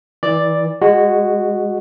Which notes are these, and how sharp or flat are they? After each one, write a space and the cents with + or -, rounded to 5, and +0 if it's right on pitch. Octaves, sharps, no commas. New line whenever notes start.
E3 -25 D5 +0
G#3 -20 F#4 +0